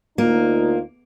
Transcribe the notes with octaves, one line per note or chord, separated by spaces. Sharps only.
D2 A#3 D#4 F4